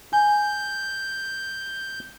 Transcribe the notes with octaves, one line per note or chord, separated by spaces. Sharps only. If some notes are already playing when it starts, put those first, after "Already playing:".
G#5 G6